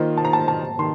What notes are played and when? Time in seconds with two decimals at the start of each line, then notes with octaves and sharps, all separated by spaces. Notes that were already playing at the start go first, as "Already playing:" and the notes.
Already playing: D#3 A#3 F4 C5 D#5
0.17 A5
0.25 A#5
0.33 A5
0.48 A5
0.79 D#3 C6